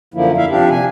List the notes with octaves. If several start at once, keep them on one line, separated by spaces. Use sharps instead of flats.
F#2 D3 F3 A#3 E4
E2 E4 E5 F5
C3 F3 D4 G4
G#5